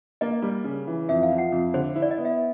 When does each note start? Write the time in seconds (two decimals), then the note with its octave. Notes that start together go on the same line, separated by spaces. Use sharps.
0.21 A#3 D#5
0.42 G3
0.64 C#3
0.87 E3
1.09 F2 E5
1.23 F5
1.31 F3
1.38 F#5
1.52 F2
1.74 D3 C5
1.95 E4
2.02 D5
2.11 D#5
2.18 B3
2.25 E5